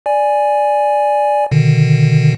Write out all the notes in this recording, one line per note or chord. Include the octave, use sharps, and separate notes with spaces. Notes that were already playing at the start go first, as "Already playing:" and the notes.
D5 G#5
B2 D3 D#3